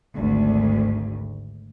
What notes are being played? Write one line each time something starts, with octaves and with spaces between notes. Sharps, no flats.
G#1 D2